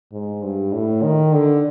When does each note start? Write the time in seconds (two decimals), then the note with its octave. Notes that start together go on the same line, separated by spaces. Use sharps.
0.12 G#2
0.43 G2
0.73 A2
1.03 D#3
1.33 D3